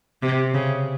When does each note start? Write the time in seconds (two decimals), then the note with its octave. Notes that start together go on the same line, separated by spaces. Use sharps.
0.23 C3
0.54 C#3